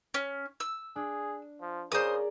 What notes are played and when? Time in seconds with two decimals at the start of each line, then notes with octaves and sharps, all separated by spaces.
0.14 C#4
0.60 E6
0.96 D4 G#4
1.61 F3
1.92 C#3 G#4 A#4 C5 D5 D#6